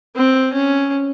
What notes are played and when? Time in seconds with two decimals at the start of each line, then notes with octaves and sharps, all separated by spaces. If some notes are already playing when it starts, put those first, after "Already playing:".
0.16 C4
0.53 C#4